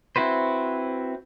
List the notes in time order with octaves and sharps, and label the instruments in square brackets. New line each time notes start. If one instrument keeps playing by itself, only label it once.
[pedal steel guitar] C4 E4 F#4 B4 C5